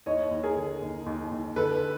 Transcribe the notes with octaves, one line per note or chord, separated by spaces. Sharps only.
D#2 C#5 D#5
D#2
G#4 A#4
D3
D#2
D#2
D#2
D3 A4 B4